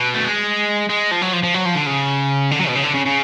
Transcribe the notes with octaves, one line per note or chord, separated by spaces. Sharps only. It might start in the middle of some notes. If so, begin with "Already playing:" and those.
Already playing: B2
A3
G#3
G#3
F3
F#3
F3
F3
F#3
F3
D3
C#3
D3
F#3
B2
C#3
D3
C#3
C#3